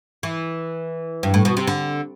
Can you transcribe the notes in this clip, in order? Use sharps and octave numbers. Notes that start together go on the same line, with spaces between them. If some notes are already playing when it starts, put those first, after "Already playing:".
E3
G2
A2
B2
C3
D3